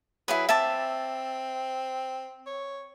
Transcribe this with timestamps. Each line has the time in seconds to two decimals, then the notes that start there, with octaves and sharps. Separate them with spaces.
0.28 F#3 E4 G#4 B4
0.49 C4 E5 A5 D6
2.46 C#5